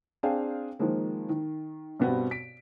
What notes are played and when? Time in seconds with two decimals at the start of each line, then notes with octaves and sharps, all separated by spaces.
0.23 C4 D4 G#4 F5 G5
0.79 D#3 F3 G#3 A#3
1.29 D#3
2.00 G2 B2 B3 C4 F#4
2.31 B6 D7